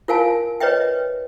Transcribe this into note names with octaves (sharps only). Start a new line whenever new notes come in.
F4 A#4 F5 G#5 A5
B4 C#5 D#5 E5 G5